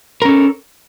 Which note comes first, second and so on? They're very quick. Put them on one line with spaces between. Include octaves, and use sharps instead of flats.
A#4 C#4 A4